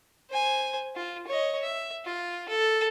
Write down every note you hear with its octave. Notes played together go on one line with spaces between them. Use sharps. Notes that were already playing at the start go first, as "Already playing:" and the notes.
C5 G#5
F4
C#5 D#5
E5
F4
A4